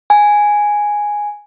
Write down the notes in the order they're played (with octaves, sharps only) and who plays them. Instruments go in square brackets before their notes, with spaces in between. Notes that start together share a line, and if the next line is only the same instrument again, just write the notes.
[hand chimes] G#5